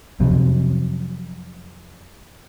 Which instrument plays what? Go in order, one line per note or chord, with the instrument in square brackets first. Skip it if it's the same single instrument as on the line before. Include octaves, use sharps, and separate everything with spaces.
[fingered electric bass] F2 C3 F#3